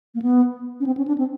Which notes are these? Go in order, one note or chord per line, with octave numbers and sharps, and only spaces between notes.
A#3
B3
C#4
C4
C#4
D4
C4